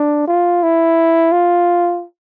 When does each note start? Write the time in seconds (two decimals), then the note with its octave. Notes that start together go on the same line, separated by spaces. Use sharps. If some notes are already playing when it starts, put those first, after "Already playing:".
Already playing: D4
0.28 F4
0.63 E4
1.32 F4